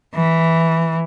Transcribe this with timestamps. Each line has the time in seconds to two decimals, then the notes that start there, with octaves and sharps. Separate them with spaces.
0.16 E3